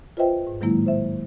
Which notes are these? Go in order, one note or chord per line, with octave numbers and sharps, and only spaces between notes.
F4 B4 C5 D#5 E5 G5
G#2
A2 D#3 F#3 G#3 A#3 E4
C5 E5